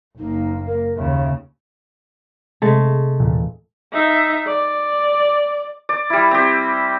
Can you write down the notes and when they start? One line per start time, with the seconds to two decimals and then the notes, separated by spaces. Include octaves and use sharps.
0.18 F#1 A#3 D#4
0.66 A#4
0.96 D#2 C#3 E5
2.62 C3 G#3 A3 A6
3.20 D#1 A#2 E3
3.93 D#4 E5
4.46 D5
5.89 D5
6.10 G3 E4
6.31 C4 G4